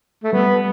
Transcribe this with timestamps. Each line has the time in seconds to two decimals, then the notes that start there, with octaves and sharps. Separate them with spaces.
0.23 A3
0.33 G3 B3